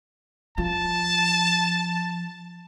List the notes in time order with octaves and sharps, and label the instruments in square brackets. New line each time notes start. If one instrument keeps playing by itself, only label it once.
[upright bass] F3 [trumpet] A5